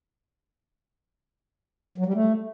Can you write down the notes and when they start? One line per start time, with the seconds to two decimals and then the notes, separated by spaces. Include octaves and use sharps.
1.98 F#3
2.06 G3
2.14 A3